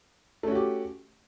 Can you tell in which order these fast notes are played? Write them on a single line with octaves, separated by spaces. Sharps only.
A3 C#4 F#4 G4